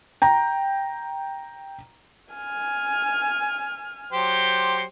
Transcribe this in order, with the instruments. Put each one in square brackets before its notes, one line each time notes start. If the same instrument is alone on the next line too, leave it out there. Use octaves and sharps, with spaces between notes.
[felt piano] G5 A#5
[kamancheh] G#5 F6
[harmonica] F#3 G4 C5